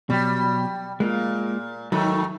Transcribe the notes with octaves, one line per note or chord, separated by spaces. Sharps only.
B2 F#3 G3 G4
A#2 G#3 A#3 F4
G#2 D#3 F#3 A3